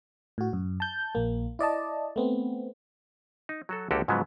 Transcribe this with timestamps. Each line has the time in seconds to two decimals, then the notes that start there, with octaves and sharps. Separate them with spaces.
0.38 A2 F#4
0.53 F#2
0.80 A5 G6
1.15 A#1 A#3
1.59 E4 D5 D#5 A5
2.16 A3 B3 C4
3.49 D#4
3.69 F#3 F#4 A4
3.91 C#2 D3 A#3 F#4 G4 A4
4.08 G#2 C#3 F3 F#3 G#3 B3